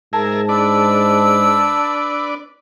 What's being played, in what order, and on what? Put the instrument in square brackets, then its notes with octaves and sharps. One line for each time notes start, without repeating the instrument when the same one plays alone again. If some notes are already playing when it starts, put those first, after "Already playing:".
[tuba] G#2 [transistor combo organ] G#4 A#4 E5 [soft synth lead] A5
[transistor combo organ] D4 B4 D5 [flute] E6